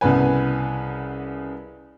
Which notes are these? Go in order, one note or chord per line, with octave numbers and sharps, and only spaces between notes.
C2 C#3 B3 B4 G#5